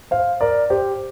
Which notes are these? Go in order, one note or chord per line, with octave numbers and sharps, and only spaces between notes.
C5 F5
A#4 D5
G4 C5